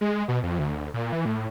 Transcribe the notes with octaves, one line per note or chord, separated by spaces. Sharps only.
G#3
B2
F2
D2
A#2
E3
A2